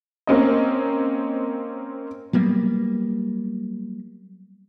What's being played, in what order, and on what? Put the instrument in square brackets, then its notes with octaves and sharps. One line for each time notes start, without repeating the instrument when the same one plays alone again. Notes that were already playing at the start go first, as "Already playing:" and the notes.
[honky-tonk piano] A#3 C4 C#4 D#5
[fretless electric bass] F#3 G3 A#3 B3